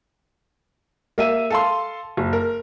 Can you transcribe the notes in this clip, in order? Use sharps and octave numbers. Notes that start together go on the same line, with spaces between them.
A#3 E5 D#7
A4 F5 C6
F#1
A#4